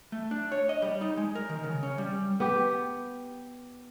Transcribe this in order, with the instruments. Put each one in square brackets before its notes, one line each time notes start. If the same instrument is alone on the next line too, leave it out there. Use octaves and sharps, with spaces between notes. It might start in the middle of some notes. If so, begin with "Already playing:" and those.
[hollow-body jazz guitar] A3
D4
C#5
D#5
G3
D#4
G#3
A#4
D#3
C#3
C#4
G3
[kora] B3 G4